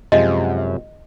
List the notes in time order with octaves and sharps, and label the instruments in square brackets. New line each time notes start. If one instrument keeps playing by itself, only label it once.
[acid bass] F#2 [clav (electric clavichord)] C3 F3 G#3 [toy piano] D#5